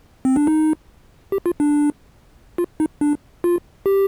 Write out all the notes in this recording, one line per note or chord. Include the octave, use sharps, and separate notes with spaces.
C4
D4
D#4
G4
F4
D4
F4
D#4
D4
F4
G4